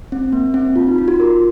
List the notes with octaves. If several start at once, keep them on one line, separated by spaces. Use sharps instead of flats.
C4
A#3
C4
F4
D#4
F4
F#4
A#4